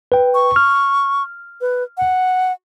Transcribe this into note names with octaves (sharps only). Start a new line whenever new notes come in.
B4 G5
C#6
F6
B4
F#5